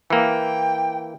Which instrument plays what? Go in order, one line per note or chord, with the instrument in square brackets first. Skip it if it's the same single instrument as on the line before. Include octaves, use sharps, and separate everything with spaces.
[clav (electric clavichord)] E3 A#3 [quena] G5